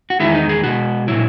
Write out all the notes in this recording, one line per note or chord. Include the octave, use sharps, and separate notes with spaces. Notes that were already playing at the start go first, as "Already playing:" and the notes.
F#4
E2 D#3 G#3 E4
D#4
G#4
B2 G#3 F#4
A#2 F#3 E4